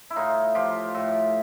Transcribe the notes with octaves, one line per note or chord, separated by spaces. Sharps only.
E4
A2 D#4 F4
F3 F4 G4
A2